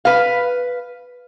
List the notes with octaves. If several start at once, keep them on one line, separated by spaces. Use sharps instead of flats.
B4 F5